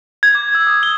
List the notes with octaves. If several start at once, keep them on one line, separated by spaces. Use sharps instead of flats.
G#6
D6
E6
D#6
G7